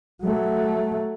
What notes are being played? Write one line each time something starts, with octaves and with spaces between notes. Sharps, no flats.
F#3 A3